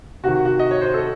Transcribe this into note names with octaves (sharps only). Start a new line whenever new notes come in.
C3 D#3 F#4
F#4
D#5
C#5
C5
A4